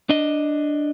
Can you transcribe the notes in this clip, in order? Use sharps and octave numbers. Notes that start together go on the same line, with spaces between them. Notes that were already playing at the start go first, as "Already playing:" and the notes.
D4 D#5